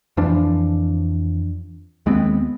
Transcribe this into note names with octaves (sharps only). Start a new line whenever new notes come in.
F2 E3 F3 D4
D#2 G#3 B3 C4